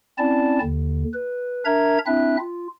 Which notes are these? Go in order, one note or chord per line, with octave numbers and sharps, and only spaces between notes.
C4 C#4 E4 D5 A5
D#2 D3
B4
D4 A#4 E5 A#5 G#6
C4 D4 E4 E5 F#6
F4